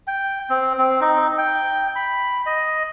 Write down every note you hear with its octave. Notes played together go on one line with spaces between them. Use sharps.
G5
C4
C4
D#4
G5
B5
D#5